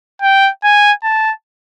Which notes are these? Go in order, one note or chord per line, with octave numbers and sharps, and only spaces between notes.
G5
G#5
A5